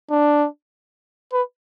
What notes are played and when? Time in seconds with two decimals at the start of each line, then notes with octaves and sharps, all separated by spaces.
0.11 D4
1.33 B4